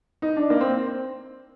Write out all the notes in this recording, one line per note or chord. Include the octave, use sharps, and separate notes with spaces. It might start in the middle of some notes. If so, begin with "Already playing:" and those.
D#4
D4
A#3
C4